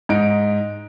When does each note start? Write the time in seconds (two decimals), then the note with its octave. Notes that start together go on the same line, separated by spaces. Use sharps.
0.09 G#2 D#4 D7